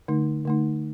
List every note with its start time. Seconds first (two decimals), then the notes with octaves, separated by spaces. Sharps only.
0.08 D3 A3 D#4
0.45 D3 A3 D#4